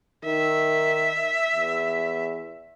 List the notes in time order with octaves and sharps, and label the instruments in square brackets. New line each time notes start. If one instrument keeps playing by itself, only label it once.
[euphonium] D#3 [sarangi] E5
[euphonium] E2